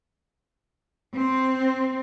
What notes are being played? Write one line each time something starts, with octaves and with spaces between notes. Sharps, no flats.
C4